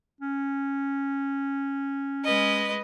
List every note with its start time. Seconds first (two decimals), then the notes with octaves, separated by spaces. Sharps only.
0.21 C#4
2.24 G#3 B4 D#5